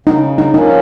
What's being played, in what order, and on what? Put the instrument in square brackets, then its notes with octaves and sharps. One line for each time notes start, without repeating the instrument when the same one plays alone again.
[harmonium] C#3 [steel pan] D#4
[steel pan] D#4
[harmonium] F3 A#3 C#4 [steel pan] D#4